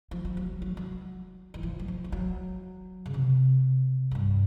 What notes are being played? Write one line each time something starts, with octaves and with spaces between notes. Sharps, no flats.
F3
F3
F#3
F#3
F#3
E3
F3
F#3
F3
F3
F#3
C#3
C3
F#2
G2